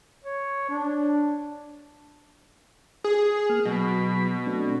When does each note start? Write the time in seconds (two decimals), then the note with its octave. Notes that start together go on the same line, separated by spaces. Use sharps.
0.24 C#5
0.69 D4
3.04 G#4
3.49 A#3 F6
3.65 B2 F#3 B5
4.46 A3 C4 D4